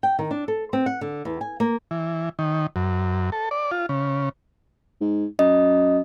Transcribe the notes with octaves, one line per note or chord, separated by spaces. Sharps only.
G5
D#3
D4
A4
C4
F#5
D3
E2
G#5
A#3
E3
D#3
F#2
A4
D5
F4
C#3
G#2
F#2 D#5